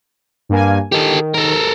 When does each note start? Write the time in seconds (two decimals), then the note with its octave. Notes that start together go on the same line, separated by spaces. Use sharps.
0.49 G2 A#3 G#5
0.92 D#3 G4 A4
1.34 A4 A#4